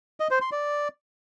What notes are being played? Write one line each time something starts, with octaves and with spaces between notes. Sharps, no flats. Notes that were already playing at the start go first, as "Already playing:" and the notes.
D#5
C5
C6
D5